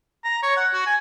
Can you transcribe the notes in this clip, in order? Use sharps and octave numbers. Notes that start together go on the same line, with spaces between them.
A#5
C#5
F#5
F#4
G#5